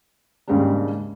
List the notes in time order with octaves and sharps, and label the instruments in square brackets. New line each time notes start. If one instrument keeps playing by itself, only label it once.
[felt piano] D#2 G#2 C#3 G3 D4